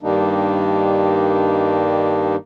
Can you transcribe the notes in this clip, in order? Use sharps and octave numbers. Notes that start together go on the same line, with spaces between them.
G2 D#3 G3 A#3 D4 D#4